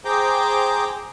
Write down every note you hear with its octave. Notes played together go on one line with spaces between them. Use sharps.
G#4 C5 G5 A#5 D6 G6